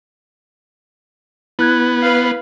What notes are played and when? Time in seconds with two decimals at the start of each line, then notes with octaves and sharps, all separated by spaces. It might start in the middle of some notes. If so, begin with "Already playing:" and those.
1.59 B3 E4 F#6 G#6
2.02 B4 F5